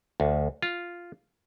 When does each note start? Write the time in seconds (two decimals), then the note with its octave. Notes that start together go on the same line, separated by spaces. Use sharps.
0.20 D2
0.63 F4